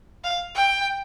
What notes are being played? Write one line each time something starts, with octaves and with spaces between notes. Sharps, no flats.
F5
G5